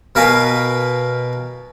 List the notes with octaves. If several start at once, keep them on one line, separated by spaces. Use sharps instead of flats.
B2 A#4 B4 F5 G#5